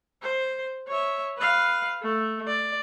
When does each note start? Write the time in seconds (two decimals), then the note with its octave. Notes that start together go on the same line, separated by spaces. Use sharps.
0.23 C5
0.88 C#5 E5
1.38 B4 F5
2.02 A3
2.47 D5